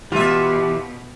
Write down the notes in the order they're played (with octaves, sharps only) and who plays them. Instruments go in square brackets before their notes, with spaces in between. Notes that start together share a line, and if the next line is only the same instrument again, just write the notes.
[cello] B2 [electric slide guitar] E3 [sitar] F4 E5 [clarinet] G4